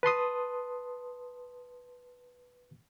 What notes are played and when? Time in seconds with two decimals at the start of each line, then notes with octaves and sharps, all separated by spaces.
0.03 B4 A5 C6 D#6